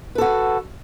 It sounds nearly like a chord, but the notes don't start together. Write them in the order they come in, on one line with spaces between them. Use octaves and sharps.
B4 A4 F#4